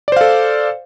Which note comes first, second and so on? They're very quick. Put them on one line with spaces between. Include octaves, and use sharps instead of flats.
D5 C5 F5 A4